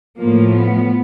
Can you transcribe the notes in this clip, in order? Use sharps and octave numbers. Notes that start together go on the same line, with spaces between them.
A2 F3 A#3
B3